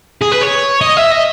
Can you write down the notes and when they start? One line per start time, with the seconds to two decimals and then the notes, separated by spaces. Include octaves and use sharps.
0.21 G#4
0.31 B4
0.41 C#5
0.81 D#5
0.97 E5
1.11 D#5